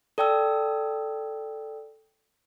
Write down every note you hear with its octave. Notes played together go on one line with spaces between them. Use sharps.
A4 D5 G5 A5 E6